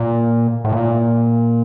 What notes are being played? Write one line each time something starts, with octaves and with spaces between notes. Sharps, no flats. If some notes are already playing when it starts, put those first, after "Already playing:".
Already playing: A#2
A2
A#2